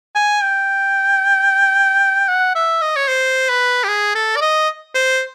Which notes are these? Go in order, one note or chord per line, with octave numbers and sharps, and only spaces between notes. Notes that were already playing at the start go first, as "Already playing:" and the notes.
G#5
G5
F#5
E5
D#5
C#5
C5
B4
G4
G#4
A4
D5
D#5
C5